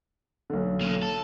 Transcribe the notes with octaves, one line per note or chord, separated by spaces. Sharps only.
B1 D3
A#3 C#4
A4